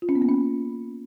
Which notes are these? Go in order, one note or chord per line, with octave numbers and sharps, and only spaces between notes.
F4
C#4
B3
A#3
C#4